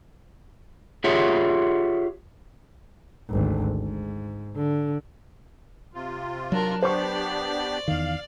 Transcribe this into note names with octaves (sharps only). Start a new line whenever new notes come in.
F4 G4 G#4 C#5 E5 F#5
G#1 D2
G#2
D3
C3 F4
F#3 D4 A#4
B3 D4 G4 C5 D5 C#6
E2 D#3 F5